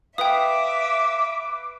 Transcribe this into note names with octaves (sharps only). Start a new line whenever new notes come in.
B4 E5 F5 G5 D6 D#6